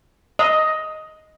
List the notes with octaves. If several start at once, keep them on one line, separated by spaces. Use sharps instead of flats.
D#5